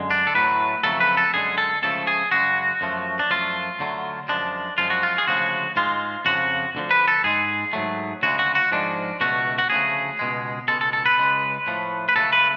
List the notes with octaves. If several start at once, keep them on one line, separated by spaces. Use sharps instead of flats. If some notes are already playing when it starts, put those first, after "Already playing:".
Already playing: F#2 D3 G#3
D4
A4
A2 F#3 A3 B4
F2 C#3 F#3 A3 A4
B4
A4
F#2 D3 G#3 G#4
A4
C#2 C#3 F3 A3 A4
G#4
F#2 C#3 G#3 F#4
F#2 F3 A3
D4
F#2 F3 A3 F4
D2 D3 F#3 A3
F#2 F3 G#3 D4
F#2 F3 G#3 F4
F#4
F4
G#4
D2 C#3 F3 G#3 F#4
G#2 G#3 F4
F2 C#3 F3 F#4
D2 D3 F3
B4
A4
G#2 G#3 G#4
G#2 F#3 A3
D2 C#3 G#3 F#4
F#4
F#4
G#2 F3 G#3 D4
C#2 B2 A3 F#4
F#4
D2 C#3 F3 A3 G#4
C#2 B2 G#3
C#2 B2 G#3 A4
A4
A4
B4
C#2 C#3 G#3
A2 F3 A3
B4
C#2 C#3 F#3 A3 A4
B4